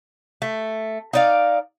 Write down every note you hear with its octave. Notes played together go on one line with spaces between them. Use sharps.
A3
D#4 D5 F5